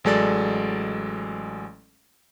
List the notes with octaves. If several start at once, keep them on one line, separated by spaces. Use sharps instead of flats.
A1 F#3 G#3 A4 D5 A6